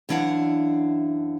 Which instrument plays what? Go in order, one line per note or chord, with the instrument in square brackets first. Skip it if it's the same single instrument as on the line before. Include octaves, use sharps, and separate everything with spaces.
[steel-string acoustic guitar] F#2 E3 D4 E4 F5 F#5